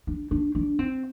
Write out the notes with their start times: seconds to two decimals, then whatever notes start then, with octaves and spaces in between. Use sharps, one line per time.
0.07 D4
0.31 D4
0.55 D4
0.79 C4